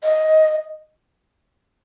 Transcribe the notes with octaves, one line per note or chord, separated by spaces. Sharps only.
D#5